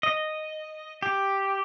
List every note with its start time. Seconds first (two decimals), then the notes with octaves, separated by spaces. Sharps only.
0.03 D#5
1.03 G4